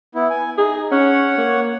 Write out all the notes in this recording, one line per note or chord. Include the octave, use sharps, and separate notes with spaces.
B3 E4
G#5
D#4 G#4
C#4 C#5 F#5
A#3